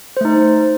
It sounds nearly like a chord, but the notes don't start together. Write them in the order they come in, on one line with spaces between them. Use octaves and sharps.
C5 A3 D#4